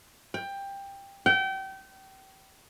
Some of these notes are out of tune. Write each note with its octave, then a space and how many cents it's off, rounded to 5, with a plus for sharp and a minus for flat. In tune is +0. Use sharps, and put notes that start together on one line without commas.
G5 +15
G5 -30